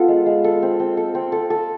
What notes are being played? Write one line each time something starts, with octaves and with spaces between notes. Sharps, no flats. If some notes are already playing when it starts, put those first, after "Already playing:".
Already playing: B3 F4 A4 F5
G#3
G#3
A4
C4
C4
A4
C4
A4
A4